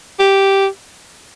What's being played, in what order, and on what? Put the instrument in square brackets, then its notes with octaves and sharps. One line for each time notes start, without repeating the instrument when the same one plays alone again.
[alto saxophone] G4